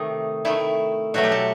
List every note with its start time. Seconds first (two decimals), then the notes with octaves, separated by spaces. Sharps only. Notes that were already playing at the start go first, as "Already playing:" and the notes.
Already playing: C3 D#3 A3 D#4
0.45 D#3 A3 E4
1.14 B2 F#3 A3 F#4
1.24 G4
1.32 A4